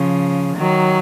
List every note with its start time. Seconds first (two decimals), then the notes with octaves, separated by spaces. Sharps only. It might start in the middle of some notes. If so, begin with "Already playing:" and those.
Already playing: C#3 F3
0.57 D#3 F#3